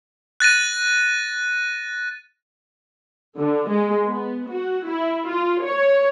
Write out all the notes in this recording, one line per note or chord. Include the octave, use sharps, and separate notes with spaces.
F#6 A6 A#6 D#7
D3
G#3
B3
F#4
E4
F4
C#5